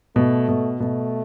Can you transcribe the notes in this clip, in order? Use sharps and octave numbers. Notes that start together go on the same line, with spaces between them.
B2 A3
B2
B2 A3